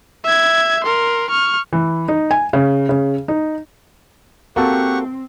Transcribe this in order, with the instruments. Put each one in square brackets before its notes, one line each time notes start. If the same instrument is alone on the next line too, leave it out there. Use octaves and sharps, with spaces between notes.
[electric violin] E5 G#6
A#4 C6
C#6 F6
[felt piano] E3
D#4
G#5
C#3
C#3
D#4
[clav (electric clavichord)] A#3 F#4 A4 [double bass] C4 [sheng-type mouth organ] G4 F#5 C#6